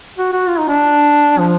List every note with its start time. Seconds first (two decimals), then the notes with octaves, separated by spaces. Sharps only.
0.18 F#4
0.33 F#4
0.48 F4
0.58 D#4
0.68 D4
1.38 F3